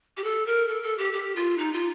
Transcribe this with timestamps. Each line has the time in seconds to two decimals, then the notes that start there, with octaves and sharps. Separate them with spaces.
0.17 G4
0.24 A4
0.46 A#4
0.68 A4
0.83 A4
0.98 G4
1.13 G4
1.36 F4
1.58 D#4
1.73 F4